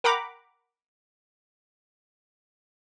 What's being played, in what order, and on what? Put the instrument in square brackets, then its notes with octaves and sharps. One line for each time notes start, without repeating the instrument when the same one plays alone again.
[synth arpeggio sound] A#4 F#5 G5 A#5 B5 D6